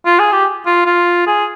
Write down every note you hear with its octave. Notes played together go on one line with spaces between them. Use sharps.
F4
G#4
G4
F4
F4
G#4